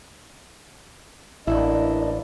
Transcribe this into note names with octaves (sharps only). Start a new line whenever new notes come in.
A1 A#3 D4 E4 D5 D#5